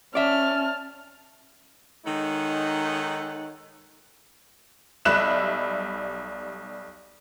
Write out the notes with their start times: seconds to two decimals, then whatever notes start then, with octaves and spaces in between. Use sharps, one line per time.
0.15 C#4 D5 E5 A5 F6
2.05 D#3 G#3 D#4 A4 C#5 F#5
5.05 B1 G3 E5 B5 F#6 E7